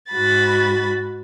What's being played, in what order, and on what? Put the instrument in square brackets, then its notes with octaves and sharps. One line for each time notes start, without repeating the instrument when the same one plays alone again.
[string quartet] G#2 F#4 B5 A6